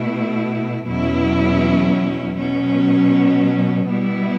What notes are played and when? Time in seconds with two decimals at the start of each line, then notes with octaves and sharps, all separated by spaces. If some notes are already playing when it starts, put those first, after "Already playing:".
Already playing: B2 A3 E4
0.87 E2 B2 F#3 C#4 E4
2.37 B2 F#3 C#4
3.88 B2 G3 B3 E4